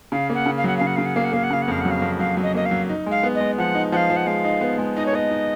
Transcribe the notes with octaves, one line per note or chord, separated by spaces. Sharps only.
C#3 F5
A#3 F#5
C#3
F5
F#3 F#5
C#3 F5
F#5
C#3 F5
F#5
A#3 F5
F#5
A#3 F5
F#5
C#3 F5
F#5
F2 F5
F#3 F#5
F5
F2
F#3 F5
F#3
D#5
A#3 D#5
F5
F#3
D#4
G#3 F5
B3
D#5
G#3
F3 F#5
D#4
F3 F5 F#5
F3
F#5
G#3 F5
D#4
B3
G#3
D#4 D#5
C#5
B3 D#5
D#4